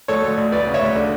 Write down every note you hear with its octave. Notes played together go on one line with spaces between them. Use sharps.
D2 A4 C#5
D2
D2
D2 B4 D5
C#3
C#5 E5
D2
D3